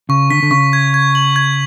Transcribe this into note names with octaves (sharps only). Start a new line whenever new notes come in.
C#3 C#6
D3 B6
D3
C#3 C#6
G#6
G#6
F#7
G#6